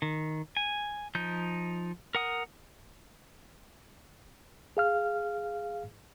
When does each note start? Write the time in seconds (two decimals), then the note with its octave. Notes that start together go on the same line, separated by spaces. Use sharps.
0.02 D#3
0.57 G#5
1.15 F3 D#4 G6
2.15 A#4 F#5 D#6
4.77 G#4 F5 F6